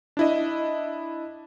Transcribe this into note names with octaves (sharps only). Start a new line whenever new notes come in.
D4 E4 D#5